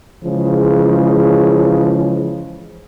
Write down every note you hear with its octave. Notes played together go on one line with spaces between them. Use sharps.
C#3 E3 F3 G#3